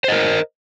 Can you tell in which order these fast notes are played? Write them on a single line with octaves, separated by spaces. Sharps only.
C5 D#5 A#4